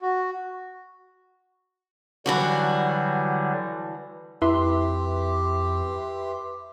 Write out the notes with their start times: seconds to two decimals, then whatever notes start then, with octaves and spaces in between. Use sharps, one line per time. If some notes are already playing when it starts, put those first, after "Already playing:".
0.01 F#4
2.26 D3 E3 F#3 G3 D4 F#4
4.42 F2 E4 G4 B4 E5 C6